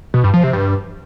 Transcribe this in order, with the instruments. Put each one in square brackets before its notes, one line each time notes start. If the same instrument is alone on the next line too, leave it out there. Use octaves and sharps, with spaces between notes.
[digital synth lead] B2
G2
F3
C3
G2